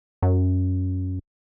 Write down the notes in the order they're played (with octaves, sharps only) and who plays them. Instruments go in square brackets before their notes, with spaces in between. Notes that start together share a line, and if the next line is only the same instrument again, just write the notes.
[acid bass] F#2